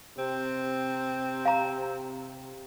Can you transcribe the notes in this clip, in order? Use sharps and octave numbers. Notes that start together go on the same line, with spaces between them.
C3 C4
F5 A#5